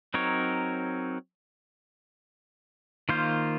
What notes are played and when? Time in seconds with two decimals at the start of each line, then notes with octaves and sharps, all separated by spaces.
0.14 F#3 C4 D#4 A#4 C#5
3.09 D#3 A#3 F4 C5